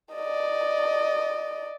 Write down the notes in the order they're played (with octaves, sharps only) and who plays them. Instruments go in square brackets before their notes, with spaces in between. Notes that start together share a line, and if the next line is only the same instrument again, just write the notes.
[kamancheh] D5 D#5